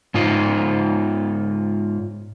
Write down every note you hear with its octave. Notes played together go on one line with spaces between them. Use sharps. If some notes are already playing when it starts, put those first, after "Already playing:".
G#2 D#4 F4 C5